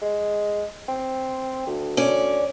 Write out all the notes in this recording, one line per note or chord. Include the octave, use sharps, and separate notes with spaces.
G#3
C4
D2
C#4 D5